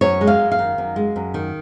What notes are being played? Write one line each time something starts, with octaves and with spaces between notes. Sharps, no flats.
F#2 C#5
G#3
F5
F#2
F5
D#3
F#2
G#3
F#2
D#3